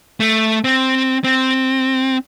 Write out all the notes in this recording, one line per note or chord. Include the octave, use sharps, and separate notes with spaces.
A3
C4
C4